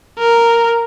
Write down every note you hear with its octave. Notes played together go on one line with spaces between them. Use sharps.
A#4